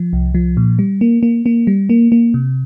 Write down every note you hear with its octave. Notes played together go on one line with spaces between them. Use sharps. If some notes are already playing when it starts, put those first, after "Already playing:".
Already playing: F3
C2
F3
A#2
G3
A#3
A#3
A#3
G3
A#3
A#3
C3